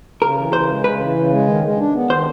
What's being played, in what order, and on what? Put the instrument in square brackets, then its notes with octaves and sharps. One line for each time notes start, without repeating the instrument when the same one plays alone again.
[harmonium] C#3 [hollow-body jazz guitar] A#4
[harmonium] E3
[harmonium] C#3 [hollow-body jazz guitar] C5
[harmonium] G#3
[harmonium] C#3 [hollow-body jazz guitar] B4
[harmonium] E3
C#3
G#3
D#3
G#3
D4
B3
[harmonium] D#3 [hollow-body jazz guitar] C5